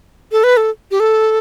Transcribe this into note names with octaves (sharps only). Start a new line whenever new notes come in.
A4
B4
A4
G4
A4